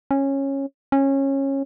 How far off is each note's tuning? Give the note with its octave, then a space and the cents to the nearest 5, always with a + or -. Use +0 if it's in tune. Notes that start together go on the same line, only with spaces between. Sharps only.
C#4 -15
C#4 -20